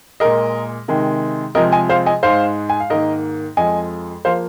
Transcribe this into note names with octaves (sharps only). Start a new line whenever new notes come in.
A#2 G#3 A#4 D#5
C3 D#3 G#3
C3 F3 G#3 A#4 D#5
D#5 G#5
C5 F5
D#5 G#5
G#2 G#3 C5 F5
G#5
F5
G#2 D#3 A#3 A#4 D#5
F2 F3 G#3 D#5 G#5
F3 A#3 C5 F5